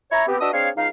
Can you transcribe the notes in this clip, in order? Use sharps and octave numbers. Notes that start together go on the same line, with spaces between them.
E4 C#5 A#5
B3 C4 G4
D4 F#4 B4 D#5 D#6 E6
C4 D4 G#4 C#5 F5
C#2 D#4 F5